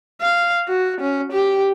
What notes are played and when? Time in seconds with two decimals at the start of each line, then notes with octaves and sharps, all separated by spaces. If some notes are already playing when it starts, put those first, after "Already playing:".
0.21 F5
0.68 F#4
1.00 C#4
1.32 G4